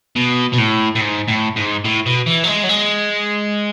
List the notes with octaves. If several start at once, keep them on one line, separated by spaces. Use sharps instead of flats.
B2
B2
A2
A2
G#2
A2
G#2
A2
B2
E3
F#3
G#3
F#3
G#3